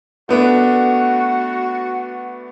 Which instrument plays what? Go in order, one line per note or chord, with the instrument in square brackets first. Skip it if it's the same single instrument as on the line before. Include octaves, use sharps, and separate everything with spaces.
[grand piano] A3 B3 D4 [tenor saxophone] F#4